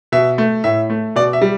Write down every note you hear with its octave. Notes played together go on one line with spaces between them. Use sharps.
B2 E5
A3
A2 E5
A3
B2 D5
E5
G3